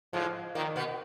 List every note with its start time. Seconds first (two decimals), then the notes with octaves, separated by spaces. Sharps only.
0.13 G#2 F3 G#3
0.55 A#2 D#3 A#3
0.76 B2 B3